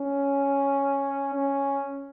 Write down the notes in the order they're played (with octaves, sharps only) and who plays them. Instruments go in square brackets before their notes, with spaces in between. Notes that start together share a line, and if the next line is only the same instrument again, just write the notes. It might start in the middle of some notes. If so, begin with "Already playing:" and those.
Already playing: [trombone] C#4
C#4